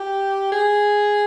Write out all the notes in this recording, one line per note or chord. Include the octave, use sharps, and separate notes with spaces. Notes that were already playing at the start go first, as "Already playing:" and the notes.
Already playing: G4
G#4